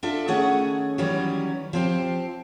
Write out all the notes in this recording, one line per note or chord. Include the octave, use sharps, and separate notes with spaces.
D4 F4 A4 E5
D#3 A3 C#4 G#4 F#5
D#3 E3 F#3 G3 C#4
F3 C4 G4